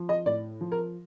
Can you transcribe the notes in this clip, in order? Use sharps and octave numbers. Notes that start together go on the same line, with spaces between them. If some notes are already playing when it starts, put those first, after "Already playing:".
Already playing: F3
D#5
A2 D5
F3
A#4